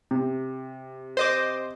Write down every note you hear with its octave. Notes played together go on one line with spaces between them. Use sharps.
C3
C5 D#5 D6